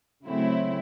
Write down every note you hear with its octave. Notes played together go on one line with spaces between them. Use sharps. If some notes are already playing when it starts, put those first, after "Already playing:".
C#3 F#3 A3 C4 E4